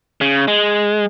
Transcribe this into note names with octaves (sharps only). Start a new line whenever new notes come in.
C#3
G#3